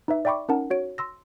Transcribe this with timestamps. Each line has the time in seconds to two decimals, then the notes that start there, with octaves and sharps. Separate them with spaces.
0.08 D#4 B4 E5
0.25 D5 E5 G5 B5 C#6 D6
0.49 C#4 D#4 A#4 F#5 A5
0.70 F#4 C#5 D7
0.98 C6 E6 A#6